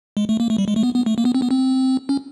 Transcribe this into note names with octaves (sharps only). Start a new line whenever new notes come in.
G#3
A3
A#3
A3
G3
G#3
A3
B3
B3
A3
A#3
B3
C4
B3
C4
C#4